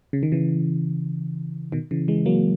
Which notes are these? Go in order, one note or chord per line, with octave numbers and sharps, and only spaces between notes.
C#3
D#3
C#3 E3
B2 D#3
C#3 E3
E3 G#3
F#3 A#3